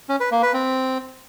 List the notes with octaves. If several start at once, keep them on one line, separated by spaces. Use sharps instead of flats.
C#4
B4
A#3
B4
C4